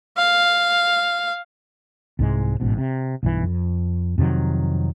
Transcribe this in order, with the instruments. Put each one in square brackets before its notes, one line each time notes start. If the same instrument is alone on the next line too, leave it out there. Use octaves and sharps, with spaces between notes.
[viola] F5
[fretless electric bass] C2 G#2 G#3
A1 G#2 B2
C3
B1 G2 C#3 E3
F2
F2 C3 D#3 F#3